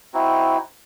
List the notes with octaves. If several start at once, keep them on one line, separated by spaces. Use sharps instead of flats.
C4 D#4 E4 F#4